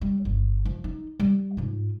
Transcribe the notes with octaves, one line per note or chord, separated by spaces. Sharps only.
G3
G1 C#4
F3
D#4
G3
G#2 F4